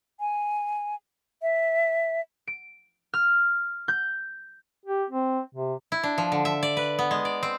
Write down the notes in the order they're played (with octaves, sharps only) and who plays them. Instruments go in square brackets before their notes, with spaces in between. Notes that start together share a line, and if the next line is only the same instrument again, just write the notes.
[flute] G#5
E5
[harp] D7
F6
G6
[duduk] G4
C4
C3
[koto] E4
D4
F3
D3
E5
D5
B4
B3
G#3
D5
C4